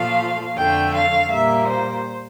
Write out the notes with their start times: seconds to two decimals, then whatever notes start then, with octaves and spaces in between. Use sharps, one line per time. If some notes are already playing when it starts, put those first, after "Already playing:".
Already playing: A#2 F3 A3 F5
0.56 F2 D3 A3 G5
0.94 F5
1.31 A#2 G3 A#3 E5
1.68 C5